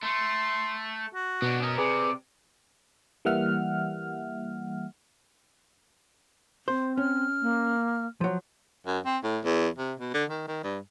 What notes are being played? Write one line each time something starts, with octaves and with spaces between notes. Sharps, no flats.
A3 C6
F#4
B2 B3 D4
C#4 A#4 D#5
C3 G#4 B4 D5
E3 G3 A#3 E5 F#5 F6
C4 C5
C#4 F6
A#3
F3 F#3
F#2
C4
A2
E2
C3
B2
D3
D#3
D#3
G2